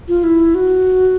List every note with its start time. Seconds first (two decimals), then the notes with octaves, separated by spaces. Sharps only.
0.08 F4
0.24 E4
0.55 F#4